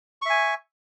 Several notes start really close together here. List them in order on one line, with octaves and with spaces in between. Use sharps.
C#6 E5 G#5